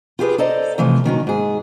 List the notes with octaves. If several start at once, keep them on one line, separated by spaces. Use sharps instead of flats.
F4 G4 G#4 B4
A4 C5 D5 D#5 A#5
C3 E3 F3 A3
A#2 D#3 F#3 C#4
G#2 G#4